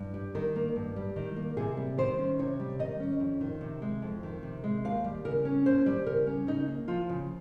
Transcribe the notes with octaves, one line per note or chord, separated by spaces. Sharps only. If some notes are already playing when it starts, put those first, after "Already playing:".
Already playing: G2
G3
D#3 A#4
A#3
G2
G3
D#3
A#3
C3 G#4
G3
D#3 C5
C#4
C3 C#5
G3
D#3 D#5
C#4
F2
D#3
C3
G#3
F2
D#3
C3
G#3
D#2 F5
G3
C#3 A#4
C#4
D#2 C5
G3
C#3 A#4
C#4
C#3 D#4
A#3
F3 F4
C#3